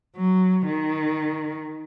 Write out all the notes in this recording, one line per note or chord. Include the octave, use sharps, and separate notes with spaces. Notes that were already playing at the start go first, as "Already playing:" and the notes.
F#3
D#3